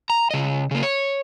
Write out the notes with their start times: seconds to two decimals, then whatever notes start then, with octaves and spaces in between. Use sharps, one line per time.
0.10 A#5
0.31 C#3 D#5
0.71 C#3 A#3
0.83 C#5